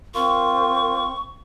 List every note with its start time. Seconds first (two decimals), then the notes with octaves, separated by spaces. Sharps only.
0.14 C4 F4 A#4 C#6